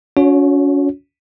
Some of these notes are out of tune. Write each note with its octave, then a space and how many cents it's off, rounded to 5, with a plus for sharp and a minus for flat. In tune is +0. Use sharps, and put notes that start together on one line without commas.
C#4 +35 F#4 -30 C#5 +0